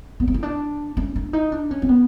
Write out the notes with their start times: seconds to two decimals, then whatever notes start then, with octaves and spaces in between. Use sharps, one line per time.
0.20 B3
0.28 C4
0.34 C#4
0.43 D4
0.97 C#4
1.16 D4
1.33 D#4
1.52 D4
1.71 C#4
1.82 C4
1.89 B3